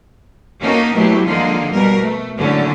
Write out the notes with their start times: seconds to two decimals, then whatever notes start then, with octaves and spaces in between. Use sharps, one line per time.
0.62 A#3 C#4 D#4 F#4 A4 A#4
0.95 B2 F#3 A3 E4 G4
1.26 D3 F3 G#3 A#3 D#4 F4
1.72 B2 G3 A#4
2.02 A3
2.37 A2 D3 F#3 A3 A#3 C#4